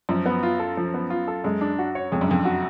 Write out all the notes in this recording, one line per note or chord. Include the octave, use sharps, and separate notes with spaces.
F#2 F3
B3
F4
A4
F3
B3
F4
A4
F#2 G#3
D4
F#4
C#5
F2 G#3
F#2
F2 D4
F#4